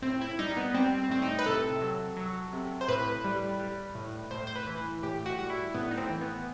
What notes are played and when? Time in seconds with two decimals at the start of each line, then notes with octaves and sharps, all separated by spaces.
0.02 A2 C4
0.21 E4
0.39 G3 D#4
0.57 B3
0.74 G3 C4
0.98 C4
1.10 A2 C4
1.22 D#4
1.39 B4
1.46 C3 A4
1.81 F#3
2.16 F#3
2.53 C3
2.81 C5
2.88 A2 B4
3.25 G3
3.60 G3
3.95 A2
4.31 A2 C5
4.47 C5
4.56 B4
4.66 E3
5.03 A2 G4
5.26 F#4
5.38 G3 F#4
5.50 E4
5.74 A2 B3
5.91 D#4
5.97 C4
6.09 E3
6.21 B3